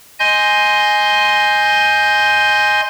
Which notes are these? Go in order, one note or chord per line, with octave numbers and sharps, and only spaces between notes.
D#5 G#5 C6 G6